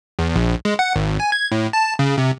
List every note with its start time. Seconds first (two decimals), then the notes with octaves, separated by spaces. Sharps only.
0.19 E2
0.36 A#1
0.65 G#3
0.79 F#5
0.96 G#1
1.20 G#5
1.32 G#6
1.52 A2
1.73 A5
1.99 C#3
2.18 C3